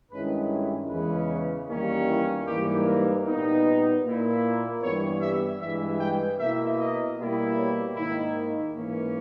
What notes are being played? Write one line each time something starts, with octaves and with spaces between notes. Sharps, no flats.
G2 D#3 G#3 C#4 E4 B4
E2 C#3 E3 G#3 C#4 B4
E2 D#3 G3 A#3 C#4
E4
G#2 E3 G3 A#3 G4
A#4
A#2 G3 B3 D#4
B4
A#2 A#3 E4
G2 E3 G3 B3 C#5
E5
G2 E3 G#3 E5
G5
B2 A#3 E4 E5
D#5
B2 G3 A#3 E4
C#5
G#2 D#3 A#3 D#4 E4
G#2 E3 A#3 C#4